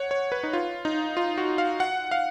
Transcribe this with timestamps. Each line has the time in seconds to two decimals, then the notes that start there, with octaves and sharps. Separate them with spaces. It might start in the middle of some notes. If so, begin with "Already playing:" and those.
Already playing: C#5 F#5
0.11 C#5
0.32 B4
0.43 D#4
0.53 F4
0.85 D#4
1.17 F4
1.38 F#4
1.58 F5
1.80 F#5
2.11 F5